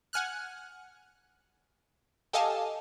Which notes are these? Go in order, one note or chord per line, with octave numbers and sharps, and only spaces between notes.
F#5 G#5 F6 F#6
G4 A4 D#5 F5 G#5 A5